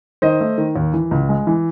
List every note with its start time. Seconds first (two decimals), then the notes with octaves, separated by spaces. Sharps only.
0.22 D#3 C5 D#5
0.41 A3
0.58 D#3
0.76 D#2
0.94 E3
1.11 C#2
1.29 G#3
1.47 E3